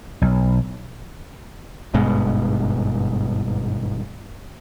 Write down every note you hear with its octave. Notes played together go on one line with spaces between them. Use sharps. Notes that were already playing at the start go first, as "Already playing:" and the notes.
B1
G#1 G2 B2 G#3